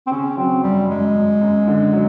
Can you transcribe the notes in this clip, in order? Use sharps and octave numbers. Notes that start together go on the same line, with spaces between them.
C4
C#3 C#4
F#3 C4
F#2 G3
F#2 G#3
F#2
F#2
D3
F#3